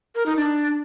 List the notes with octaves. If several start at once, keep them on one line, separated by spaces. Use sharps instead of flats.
A#4
D#4
D4